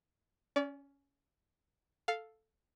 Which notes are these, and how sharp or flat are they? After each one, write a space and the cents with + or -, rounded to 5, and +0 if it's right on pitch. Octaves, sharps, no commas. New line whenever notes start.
C#4 +10 D5 -35
A4 +0 F5 +0